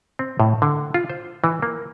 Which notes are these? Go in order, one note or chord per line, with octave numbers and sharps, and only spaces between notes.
C4
A2
D3
F4
C5
E3
A#3